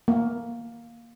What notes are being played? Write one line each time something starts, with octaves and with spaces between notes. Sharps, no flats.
A#3